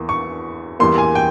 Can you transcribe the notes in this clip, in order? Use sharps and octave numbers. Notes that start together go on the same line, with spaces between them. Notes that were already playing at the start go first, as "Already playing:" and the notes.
Already playing: E2 E3 A#3
C#6
E2 E3 G3 A#3 C6
G#5
G5